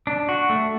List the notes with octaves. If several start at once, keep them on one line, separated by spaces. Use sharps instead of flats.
D4
F#4
A3